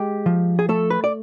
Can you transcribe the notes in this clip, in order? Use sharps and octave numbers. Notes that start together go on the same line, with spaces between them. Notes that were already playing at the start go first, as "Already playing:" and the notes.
Already playing: G#3 G4
F3
G#4
A3 A4
B4
D5